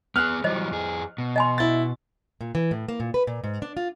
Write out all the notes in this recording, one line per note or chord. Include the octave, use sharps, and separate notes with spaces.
B3 G#4 F6 F#6
E3 F#3 G3 C5 D#5
F2 G#4
B2
D#5 G#5 C6
E4 A6
A#2
E3
A2
A#3
A#2
B4
A#2
G#2
D4
F4